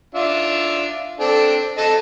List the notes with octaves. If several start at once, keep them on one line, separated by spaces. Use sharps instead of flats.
D4 F4 E5
C4 D4 A4
A4 D#5 A5